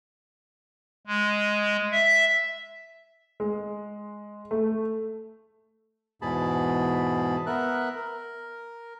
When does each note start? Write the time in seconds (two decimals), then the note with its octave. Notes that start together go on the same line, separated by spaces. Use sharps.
1.07 G#3
1.92 E5
3.40 G#3
4.51 A3
6.22 E2 G#2 B2 G#4 A5 B5
7.46 B3 A#4 E5 F#6
7.96 A#4